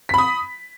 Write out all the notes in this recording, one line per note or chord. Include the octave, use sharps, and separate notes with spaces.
B5 D#6 B6